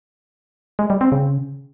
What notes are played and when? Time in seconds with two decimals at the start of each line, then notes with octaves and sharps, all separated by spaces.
0.79 G#3
0.90 G3
1.01 C4
1.12 C#3